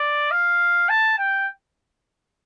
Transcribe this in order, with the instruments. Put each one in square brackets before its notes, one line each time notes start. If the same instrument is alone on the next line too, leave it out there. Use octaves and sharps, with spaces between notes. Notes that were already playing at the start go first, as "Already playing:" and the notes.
Already playing: [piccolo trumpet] D5
F5
A5
G5